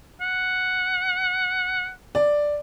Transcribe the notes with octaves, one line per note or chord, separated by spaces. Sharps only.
F#5
D5